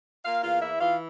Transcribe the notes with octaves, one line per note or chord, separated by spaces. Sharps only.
A#3 F4 F5
E2 F4 F5
E3 E4 E5
E3 F4 F5